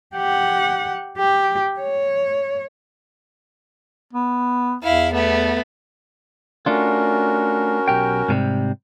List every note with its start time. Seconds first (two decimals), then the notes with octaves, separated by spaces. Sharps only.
0.15 G4 F#5
1.17 G4
1.80 C#5
4.13 B3
4.83 E2 E4 F5
5.14 A3 B3
6.66 A3 C#4 D4 F4 F#4 A#4
7.88 B1 G4 G5
8.28 G#2 C3 G3